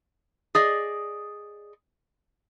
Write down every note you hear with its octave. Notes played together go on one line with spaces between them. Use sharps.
G#4 D5 D#5